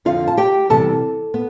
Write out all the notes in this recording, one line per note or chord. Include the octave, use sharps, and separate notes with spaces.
F2 D3 F3 F4 F5
A5
G4 G5
E2 C3 E3 G3 A4 A5
B3